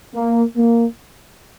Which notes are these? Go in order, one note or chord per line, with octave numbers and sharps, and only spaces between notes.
A#3
A#3